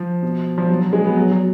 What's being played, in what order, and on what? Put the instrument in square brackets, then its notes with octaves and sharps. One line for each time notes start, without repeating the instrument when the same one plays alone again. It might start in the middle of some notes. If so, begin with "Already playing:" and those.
Already playing: [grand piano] F3
B2
F3
B2 F#3
F#3
G#3
B3
B2 F#3
F#3